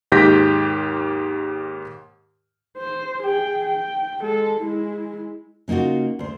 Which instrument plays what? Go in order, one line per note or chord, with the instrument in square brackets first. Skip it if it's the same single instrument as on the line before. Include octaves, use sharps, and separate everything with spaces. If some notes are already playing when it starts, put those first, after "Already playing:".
[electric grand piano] D#2 G#2 G4 G6 A#6 B6
[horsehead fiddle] C5
G#4 G5
G5
G#3 A4
G#3 E4
[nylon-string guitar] C#3 A#3 D#4 F4 F#4
D2 C5